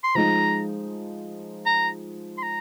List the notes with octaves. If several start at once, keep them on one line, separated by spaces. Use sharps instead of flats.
C6
F3 G#3 D#4 A#5
A#5
C6
A#5